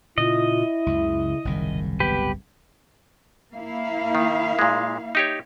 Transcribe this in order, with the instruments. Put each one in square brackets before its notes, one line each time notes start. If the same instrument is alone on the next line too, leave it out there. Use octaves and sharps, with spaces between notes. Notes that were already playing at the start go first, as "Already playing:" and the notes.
[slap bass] A#2 C#3 [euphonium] E4 [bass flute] F4 [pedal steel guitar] D#5
[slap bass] C#2 F#2 [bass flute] C#3
[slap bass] F#1 C2 G#2 [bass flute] D#3
[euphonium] B3 [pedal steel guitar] G4 B4
[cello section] A#3 E4 F5
[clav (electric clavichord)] D#3
A#2 G#3
D#4 G4 C#5